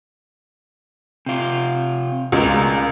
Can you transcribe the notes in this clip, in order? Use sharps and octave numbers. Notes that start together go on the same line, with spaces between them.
C3 F4
C#2 B2 A#4